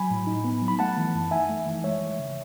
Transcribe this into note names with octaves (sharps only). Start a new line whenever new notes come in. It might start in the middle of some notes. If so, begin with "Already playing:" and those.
Already playing: F#3 G#5 B5
A2
D#4
B3
F#3
B5
A3 F#5 A5
E3
F#2
D#4 E5 G#5
A3
E3
G#3 C#5 E5
E3
C#3